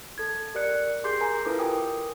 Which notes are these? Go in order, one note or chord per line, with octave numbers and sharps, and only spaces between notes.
A4 G#6
G4 A#4 D5 F#6 C#7
G4 G#4 C6 D6 G6 C7
A#4 G#5 A#5
E4 F4 A4 B4 D6
G4 A#4 G5 G#5 D6 D#6